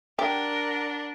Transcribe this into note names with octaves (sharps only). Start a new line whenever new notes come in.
D4 G4 A#4 F#5